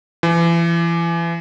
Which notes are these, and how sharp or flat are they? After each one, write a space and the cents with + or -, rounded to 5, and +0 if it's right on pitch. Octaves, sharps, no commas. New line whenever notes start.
E3 +35